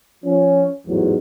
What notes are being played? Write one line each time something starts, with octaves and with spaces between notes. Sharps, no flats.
F3 C#4
A1 E2 G#2 E3 F#3